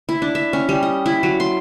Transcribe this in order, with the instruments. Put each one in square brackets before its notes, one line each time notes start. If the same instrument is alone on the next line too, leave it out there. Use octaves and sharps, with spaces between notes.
[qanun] E4
D4
E5
C#4
G3
D#5
E4
F#3
C6